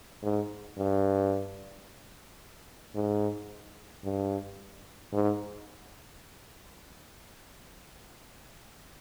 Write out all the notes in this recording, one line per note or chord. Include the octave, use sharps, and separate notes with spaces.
G#2
G2
G#2
G2
G#2